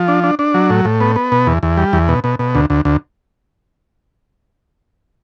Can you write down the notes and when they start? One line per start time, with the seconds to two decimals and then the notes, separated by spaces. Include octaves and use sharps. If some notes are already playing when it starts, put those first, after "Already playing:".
Already playing: F3
0.08 D4
0.24 D4
0.39 D4
0.54 F#3
0.70 A2
0.85 A2
1.01 B3
1.16 B3
1.32 B2
1.47 E2
1.63 E2
1.77 G3
1.93 E2
2.08 B2
2.24 B2
2.39 B2
2.55 D2
2.70 D2
2.85 D2